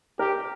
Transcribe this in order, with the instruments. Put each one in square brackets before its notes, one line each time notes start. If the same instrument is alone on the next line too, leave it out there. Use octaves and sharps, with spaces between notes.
[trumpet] G4 [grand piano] A#4